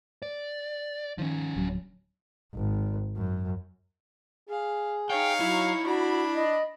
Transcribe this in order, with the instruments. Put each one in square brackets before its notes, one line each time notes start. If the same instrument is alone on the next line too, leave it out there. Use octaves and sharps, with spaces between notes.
[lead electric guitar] D5
[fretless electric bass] D#3 [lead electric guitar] F3 C#4
[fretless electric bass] D1 F#3
[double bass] G#1
F#2
[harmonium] G#4 [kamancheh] F5
[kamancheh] D#4 C#5 [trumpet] F5 [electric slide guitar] G5
[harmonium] F#3 [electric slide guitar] E4
[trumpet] D4 [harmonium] F#4 [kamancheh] B5
[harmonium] D#5